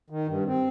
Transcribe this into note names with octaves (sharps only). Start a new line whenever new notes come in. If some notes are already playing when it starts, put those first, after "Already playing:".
D#3
G2
C4